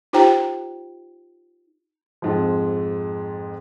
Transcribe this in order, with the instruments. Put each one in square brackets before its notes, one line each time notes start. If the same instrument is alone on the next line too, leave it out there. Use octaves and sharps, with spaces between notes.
[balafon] D#4 F4 G4 C5 G5 A#5
[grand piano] F2 G#2 F3